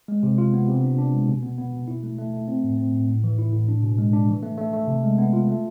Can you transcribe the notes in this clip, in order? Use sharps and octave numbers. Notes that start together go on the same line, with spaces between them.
G#3
C3
F4
B3
C3
D4
D4
G#3
B2
B3
B3
B2
E4
A3
A3
A3
C4
A2
C4
A2
A2
E3
E4
A2
D4
B2
G#3
D4
E3
A3
A3
A3
C3
G#3
B3
F4
A3